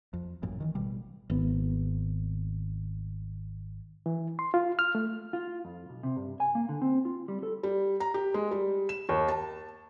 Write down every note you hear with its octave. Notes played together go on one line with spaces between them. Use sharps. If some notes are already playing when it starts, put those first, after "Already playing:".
F2
A1 F#2 A#2
D#3 E3
A1 B2 G3
G#1 B3
E3
C6
F4
F6
A3
F4
F2
B1
C3
G2
G#5
A#3
D3
C4
F4
G3
A4
G3
A#5
G4
G#3
G3
E7
D#2
A5